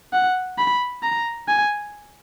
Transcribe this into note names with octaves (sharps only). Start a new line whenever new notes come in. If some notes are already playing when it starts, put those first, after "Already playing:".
F#5
B5
A#5
G#5